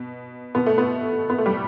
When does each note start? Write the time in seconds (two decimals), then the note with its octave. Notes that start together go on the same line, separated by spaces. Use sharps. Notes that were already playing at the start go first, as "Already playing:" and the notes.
Already playing: B2
0.55 B2 B3
0.66 A3
0.78 B3
1.30 B3
1.38 A3
1.46 G3